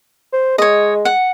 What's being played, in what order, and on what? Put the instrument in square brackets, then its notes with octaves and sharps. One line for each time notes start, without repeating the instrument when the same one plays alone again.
[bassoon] C5
[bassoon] G#3 [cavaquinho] C#5 D#5
[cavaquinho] F#5